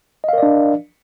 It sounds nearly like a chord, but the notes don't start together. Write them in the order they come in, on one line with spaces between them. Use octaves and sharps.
D#5 F5 A#4 D5 D4